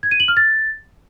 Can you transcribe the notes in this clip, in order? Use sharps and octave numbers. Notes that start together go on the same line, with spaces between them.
G#6
D#7
F#7
F6
A6